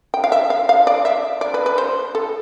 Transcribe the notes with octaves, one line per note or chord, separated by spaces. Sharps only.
G5
F5
E5
F5
F5
D5
E5
D5
B4
B4
C5
A4